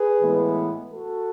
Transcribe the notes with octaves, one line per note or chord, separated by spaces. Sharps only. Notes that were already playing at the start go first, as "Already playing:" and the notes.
Already playing: G#4 B4
A2 E3 G#3 B3
F#4 A4